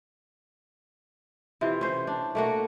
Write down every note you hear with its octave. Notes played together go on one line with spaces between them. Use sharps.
C3 E3 F4
C#4 C5
D4
A3 A#3 F#4